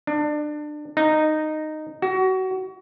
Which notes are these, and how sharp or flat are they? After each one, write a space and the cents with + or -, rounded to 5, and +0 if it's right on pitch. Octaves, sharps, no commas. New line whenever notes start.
D4 +25
D#4 -10
F#4 +25